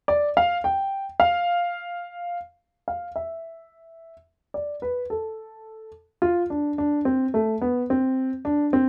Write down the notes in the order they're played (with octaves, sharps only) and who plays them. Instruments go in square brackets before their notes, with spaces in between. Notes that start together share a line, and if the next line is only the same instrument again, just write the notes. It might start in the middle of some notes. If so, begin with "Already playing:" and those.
[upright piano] D5
F5
G5
F5
F5
E5
D5
B4
A4
F4
D4
D4
C4
A3
B3
C4
D4
C4